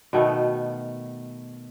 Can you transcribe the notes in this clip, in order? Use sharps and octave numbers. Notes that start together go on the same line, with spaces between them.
B2 D#3 A3 B3